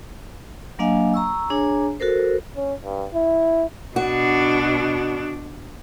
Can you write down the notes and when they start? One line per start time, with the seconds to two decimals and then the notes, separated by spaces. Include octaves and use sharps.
0.79 F#3 A#3 D4 D#5 F5 G#5
1.14 A#5 C#6 E6
1.50 D4 G#4 C#5 G#5 A#5
2.00 F#4 A4 A#4 C5
2.56 C#4
2.85 G2
3.13 E4
3.96 B2 D4 F#4